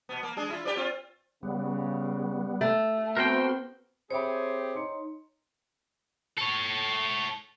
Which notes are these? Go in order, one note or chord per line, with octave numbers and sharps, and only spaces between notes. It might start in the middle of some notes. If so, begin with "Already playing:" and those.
B2 B3
A#3
G#3 D4 G#4
E4 F4
G4 B4 D5
C4 F4
C#3 G3 B3
A3
B3 C4 F#4 A#4 C5 G5 C6
C4 G4 G#4 C5 C#5 E5 B5
D#4 C6 C#7
A4 C#5